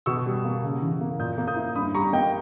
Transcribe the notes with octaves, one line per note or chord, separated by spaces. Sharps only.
B2 C#6 E6
G3
A#3
C#3
E3
A#3
A#2 D#6 G6
A#3
D#6 G6
E4
G2 B5 D#6
G3 A#5 C#6
A#3 D#5 G5